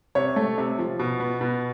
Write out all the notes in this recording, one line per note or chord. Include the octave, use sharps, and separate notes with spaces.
C3 C#5
A3
C3
F3
B2
B3
B2